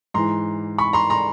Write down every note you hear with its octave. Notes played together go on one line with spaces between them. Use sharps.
G#2 E3 A#5 C6
B5 C#6
A#5 C6
A#5 C6